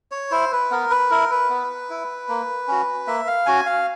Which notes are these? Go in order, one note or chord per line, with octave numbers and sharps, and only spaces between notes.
C#5
E4 C5
B4
B3 A#4
B4
E4 A#4
B4
B3
E4
A#3
C#4 F#4
A#3 E5
F5
C#4 F#4 G#5
F5